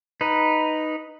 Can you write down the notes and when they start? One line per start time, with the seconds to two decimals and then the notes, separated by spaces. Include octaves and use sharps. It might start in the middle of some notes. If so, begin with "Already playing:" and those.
0.21 D#4 B4